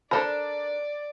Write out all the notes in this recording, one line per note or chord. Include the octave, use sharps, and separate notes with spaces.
D4 A4 A#4 C5 D5 A5 B5